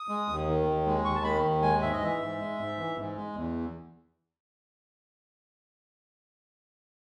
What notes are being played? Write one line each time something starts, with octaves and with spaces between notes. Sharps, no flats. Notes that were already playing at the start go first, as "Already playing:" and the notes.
Already playing: D#6
G#3
D#2
D#3
D#2
G#3
D#2 C#6
A5
D#3 B5
D#2
G#3 G#5
G#2 E5
D#5
E3 E5
G#2
G#3
G#2
E3
G#2
G#3
E2